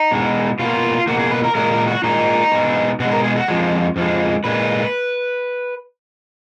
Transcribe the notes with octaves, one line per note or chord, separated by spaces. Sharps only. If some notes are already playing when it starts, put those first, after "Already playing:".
Already playing: D#4
B2 G#3
B2 A#3 F4
B2 A#3 F#4
G#4
B4
A#4
A#2 G#3 A#4
A#4
F#4
A#2 G#3 D#4
B2 G#3
B2 G#3 F#4
A#4
G#4
F#4
F2 F3 G#3
F2 F3 G#3
A#2 G#3 B4